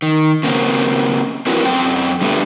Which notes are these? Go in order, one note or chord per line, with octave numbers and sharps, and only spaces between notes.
D#3
C#3 A#3 C4
C4 E4 F#4 A#4 B4
F#2 C4 G5
D3 G3 A3 B3